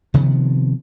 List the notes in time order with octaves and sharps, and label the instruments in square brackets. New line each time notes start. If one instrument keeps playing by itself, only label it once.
[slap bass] C3 D#3 F3 B3